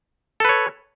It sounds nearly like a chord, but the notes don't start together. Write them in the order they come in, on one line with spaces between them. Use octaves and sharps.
A4 B4 C#5